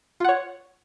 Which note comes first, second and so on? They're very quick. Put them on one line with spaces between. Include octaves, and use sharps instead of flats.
F4 F#5 C#5